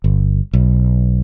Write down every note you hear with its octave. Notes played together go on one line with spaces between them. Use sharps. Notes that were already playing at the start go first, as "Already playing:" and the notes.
G1
B1